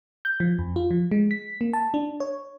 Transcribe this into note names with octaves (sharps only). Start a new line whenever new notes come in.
G6
F3
F2
F4
F3
G#3
B6
A#3
A5
D4
C#5